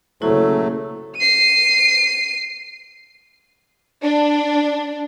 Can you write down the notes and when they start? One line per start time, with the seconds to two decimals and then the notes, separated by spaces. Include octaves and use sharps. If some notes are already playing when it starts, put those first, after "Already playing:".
0.22 C#3 F#3 A3 A#3 E4 F#4 A4 C5
1.16 C7 D#7
4.03 D4